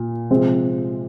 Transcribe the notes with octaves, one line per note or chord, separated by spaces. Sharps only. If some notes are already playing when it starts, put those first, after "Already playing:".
Already playing: A#2
C3 F3 G#3 C4